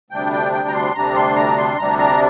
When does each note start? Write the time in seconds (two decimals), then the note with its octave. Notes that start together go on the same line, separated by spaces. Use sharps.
0.10 D2 C3 G3 D4 G5
0.32 G5
0.53 G5
0.68 A#5
0.74 C6
0.94 D2 C3 G3 D4 A#5
1.16 C6
1.36 A#5
1.58 C6
1.78 D2 C3 G3 D4 A#5
1.99 A#5